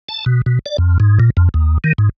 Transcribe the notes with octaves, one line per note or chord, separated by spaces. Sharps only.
A5
B2
B2
D5
F2
G#2
A#2
F2
D#2
D#3
G#2